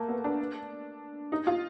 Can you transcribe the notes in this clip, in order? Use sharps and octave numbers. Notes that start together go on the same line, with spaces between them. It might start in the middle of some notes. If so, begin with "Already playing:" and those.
Already playing: A3 A#3
B3
D4
D#4
F4